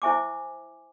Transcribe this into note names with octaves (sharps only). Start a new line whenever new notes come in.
E4 C5 E5 G#5 C#6 D6